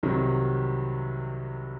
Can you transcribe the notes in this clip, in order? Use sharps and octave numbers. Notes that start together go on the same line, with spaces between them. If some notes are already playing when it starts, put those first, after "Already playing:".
C2 C3 D#3 F#3 C4